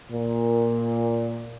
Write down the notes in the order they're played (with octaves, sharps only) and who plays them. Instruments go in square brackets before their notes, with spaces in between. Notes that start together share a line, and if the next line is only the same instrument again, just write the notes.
[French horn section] A#2